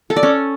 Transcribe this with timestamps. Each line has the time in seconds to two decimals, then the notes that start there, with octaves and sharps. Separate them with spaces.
0.10 A4
0.16 D5
0.23 C#4